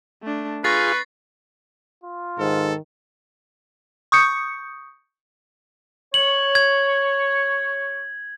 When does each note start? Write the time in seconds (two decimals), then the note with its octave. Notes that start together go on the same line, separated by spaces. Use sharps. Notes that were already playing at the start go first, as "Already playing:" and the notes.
0.22 A3 D4
0.64 F4 G#4 B4 C#6 A6 A#6 C7
2.04 F4
2.39 G#2 D#3 A4
4.12 C#6 D#6 G6 C#7
6.14 C#5 F#7
6.55 G#6